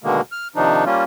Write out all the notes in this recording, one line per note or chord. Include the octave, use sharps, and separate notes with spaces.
B2 D3 D#3 G#3 A#3
F6
C3 D#3 F3 D4 D#4
G3 A#3 C#4 F4